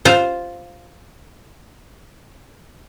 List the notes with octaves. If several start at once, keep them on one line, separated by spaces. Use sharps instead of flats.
F4 C5